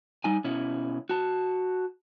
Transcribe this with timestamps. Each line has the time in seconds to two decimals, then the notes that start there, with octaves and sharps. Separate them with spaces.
0.24 G3 D#4 G#5
0.44 B2 C#4 E4
1.09 F#4 A5